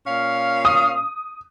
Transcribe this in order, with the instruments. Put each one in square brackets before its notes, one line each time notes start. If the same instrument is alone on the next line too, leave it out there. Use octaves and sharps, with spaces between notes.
[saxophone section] A#2 C#4 F5
[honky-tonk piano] D#6